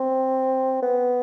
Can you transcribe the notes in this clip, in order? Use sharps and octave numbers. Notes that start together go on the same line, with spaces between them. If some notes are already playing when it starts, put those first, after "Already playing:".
Already playing: C4
B3